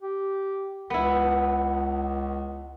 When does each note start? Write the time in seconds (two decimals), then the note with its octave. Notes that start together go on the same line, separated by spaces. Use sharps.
0.02 G4
0.90 C#2 B3 E4